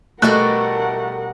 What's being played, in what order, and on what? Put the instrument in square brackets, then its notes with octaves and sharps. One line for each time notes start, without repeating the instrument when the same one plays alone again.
[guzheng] B2 G3 F#4 [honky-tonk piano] A3 F#6 [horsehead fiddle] A#4 F#5